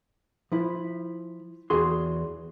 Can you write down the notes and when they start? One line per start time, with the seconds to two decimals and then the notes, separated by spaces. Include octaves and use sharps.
0.52 F3 E4
1.70 E2 F#4 G#4 C6